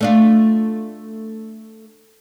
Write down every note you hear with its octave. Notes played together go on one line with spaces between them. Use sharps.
A3 D4 F4